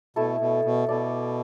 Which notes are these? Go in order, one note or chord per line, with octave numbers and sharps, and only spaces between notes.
B2 A3 E4 A4
B2
B2
B2 E4 A4 D5